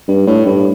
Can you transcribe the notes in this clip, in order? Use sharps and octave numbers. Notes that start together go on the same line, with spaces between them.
G2
A2
G2